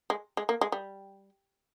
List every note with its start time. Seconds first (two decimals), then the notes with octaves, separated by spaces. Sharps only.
0.10 G#3
0.37 G#3
0.49 A#3
0.61 G#3
0.72 G3